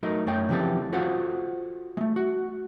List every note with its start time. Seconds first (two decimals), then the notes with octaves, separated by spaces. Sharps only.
0.03 F#3 A3 D#4 A#4
0.26 F#2 A3 C#5 G5
0.49 C#3 E3 F3 C4 G4 A4
0.92 F4 F#4 A4 C5 F5 F#5
1.97 G#3 A3
2.16 F#4